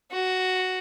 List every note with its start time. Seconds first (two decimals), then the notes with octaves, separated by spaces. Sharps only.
0.11 F#4